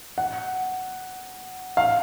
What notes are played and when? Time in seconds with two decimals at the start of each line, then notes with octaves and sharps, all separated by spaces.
0.18 F#5
1.77 F5